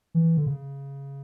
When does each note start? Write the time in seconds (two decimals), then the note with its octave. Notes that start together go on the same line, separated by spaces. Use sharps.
0.14 E3
0.37 D3
0.46 C#3